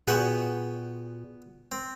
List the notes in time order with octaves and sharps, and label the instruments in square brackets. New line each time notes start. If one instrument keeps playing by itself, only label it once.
[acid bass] A#2 [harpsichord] B3 F#5 G5 [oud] F#4 G#4
[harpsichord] C4